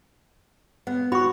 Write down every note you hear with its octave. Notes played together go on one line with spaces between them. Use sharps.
B3 F#5
F#4 B5 C#6